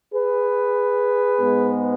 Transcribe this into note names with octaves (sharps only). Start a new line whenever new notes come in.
G#4 B4
G#2 G#3 B3